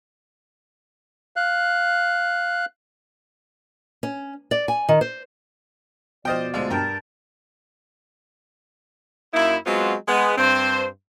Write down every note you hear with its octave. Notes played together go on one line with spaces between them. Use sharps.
F5 F#6
C#4
D5
G#5
D#3
C5
B2 F3 C5 D5 D#5 G5 F6
D2 G#3 F4 C5
G2 A#4 G5 A5
F#2 A#3 D#4 E4
F#3 G#3 B3 C4 F4 F#4
G#3 B3
G2 C4 C5